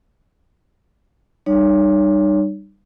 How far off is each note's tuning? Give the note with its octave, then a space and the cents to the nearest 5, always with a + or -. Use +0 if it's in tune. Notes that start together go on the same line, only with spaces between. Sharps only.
G3 +0 D#4 -35 C#5 +25